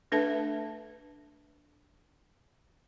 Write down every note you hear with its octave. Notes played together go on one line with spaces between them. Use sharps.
A3 D4 A4 B4 E5 A5